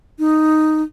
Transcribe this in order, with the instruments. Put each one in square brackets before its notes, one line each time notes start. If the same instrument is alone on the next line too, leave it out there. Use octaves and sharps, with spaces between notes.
[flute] D#4